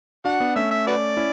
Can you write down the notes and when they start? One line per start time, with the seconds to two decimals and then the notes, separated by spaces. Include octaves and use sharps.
0.25 D4 F#4 F#5
0.40 B3 D4
0.56 A3 C#4 E5
0.71 E5
0.87 F#4 B4 D5
1.17 C#4 E4